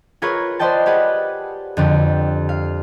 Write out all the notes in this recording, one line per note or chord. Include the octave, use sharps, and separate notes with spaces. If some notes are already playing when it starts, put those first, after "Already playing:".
F4 G#4 A#4 B4 C#5
B4 C5 D5 D#5 G5 A5
G4 G#4 B4 F#5
F2 D3 G4
F5